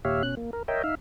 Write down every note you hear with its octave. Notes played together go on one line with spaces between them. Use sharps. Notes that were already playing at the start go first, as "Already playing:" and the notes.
D#2 A#2 G4 C#5 E5 F5
B2 C#4 F#6
A#3
A#4
A#4 C#5 D#5 E5 G5
D#4 E5 F5